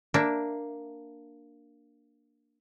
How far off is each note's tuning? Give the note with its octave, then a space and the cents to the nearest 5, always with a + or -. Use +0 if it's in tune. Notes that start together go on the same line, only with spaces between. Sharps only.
A#3 +0 D4 +0 E5 +0